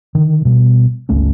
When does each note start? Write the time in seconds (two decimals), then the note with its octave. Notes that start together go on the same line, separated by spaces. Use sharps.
0.15 D3 D#3
0.45 B2 G3 B3
1.09 G1 C#2 A3 C#4